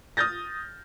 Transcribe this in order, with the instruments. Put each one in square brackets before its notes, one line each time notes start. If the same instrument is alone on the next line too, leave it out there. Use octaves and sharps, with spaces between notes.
[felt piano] D#6 F6 G6 A6 A#6